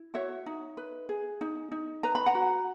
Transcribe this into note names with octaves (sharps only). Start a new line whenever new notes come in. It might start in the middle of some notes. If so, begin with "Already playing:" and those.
Already playing: E4
F#4 C#5 E5
D#4
B4
G#4
D#4
D#4
B4 A#5
B5
F#5 A#5
F#4